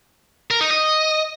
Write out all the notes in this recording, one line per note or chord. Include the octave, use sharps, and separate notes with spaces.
A#4
D#4
D#5